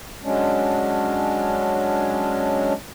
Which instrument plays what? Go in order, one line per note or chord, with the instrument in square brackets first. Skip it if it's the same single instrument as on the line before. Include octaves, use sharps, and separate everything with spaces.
[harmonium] F#3 G#3 C#4 D4